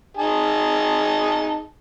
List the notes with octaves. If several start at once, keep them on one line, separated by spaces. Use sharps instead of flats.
D#4 G#4 A5